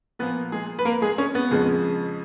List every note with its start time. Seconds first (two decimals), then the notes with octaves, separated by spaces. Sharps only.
0.19 A#2 F3 A#3 B3 B4
0.52 G#3 G#4
0.79 B4
0.85 A#3 A#4
1.02 G#3 G#4
1.18 C#4
1.35 B3
1.51 F2 C#3 G#3